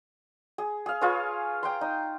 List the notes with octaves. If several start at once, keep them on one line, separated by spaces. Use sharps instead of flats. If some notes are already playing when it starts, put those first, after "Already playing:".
G#4
G#4 F5
F4 G#4 B4 C#5
G5 A#5 C6
D#4